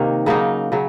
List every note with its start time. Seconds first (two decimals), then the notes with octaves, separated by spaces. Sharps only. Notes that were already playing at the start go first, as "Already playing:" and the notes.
Already playing: C3 D#3 A#3
0.26 C#3 F#3 A#3 D#4
0.72 C#3 F#3